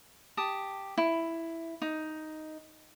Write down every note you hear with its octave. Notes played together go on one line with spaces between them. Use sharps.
G4 A5 D#6
E4
D#4